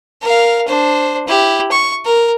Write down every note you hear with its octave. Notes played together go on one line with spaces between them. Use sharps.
A#4 F5
D4 C5
E4 G4
C#6
A#4